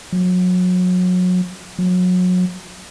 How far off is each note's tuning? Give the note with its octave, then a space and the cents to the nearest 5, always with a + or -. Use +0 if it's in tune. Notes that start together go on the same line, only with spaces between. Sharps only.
F#3 -30
F#3 -30